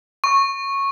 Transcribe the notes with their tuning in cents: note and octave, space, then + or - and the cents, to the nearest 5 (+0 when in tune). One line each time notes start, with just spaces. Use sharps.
C#6 -10